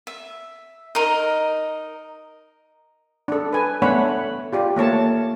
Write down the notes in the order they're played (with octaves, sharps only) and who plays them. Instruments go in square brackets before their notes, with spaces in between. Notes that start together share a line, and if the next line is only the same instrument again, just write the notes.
[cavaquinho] E5
D#4 A#4 D#5
[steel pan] D4 A4
B4 G#5
A3 B3 D4 C#5 F#5 B5
F4 G4 D5
A3 A#3 C#5 A5